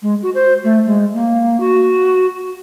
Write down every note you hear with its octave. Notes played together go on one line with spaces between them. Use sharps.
G#3
F#4
C5
A3
G#3
A#3
F#4